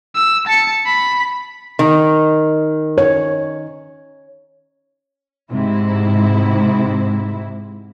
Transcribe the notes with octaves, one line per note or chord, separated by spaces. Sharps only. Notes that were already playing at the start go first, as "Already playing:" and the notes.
E6
A5 C#7
B5
D#3
C#5
G#2 C3 E4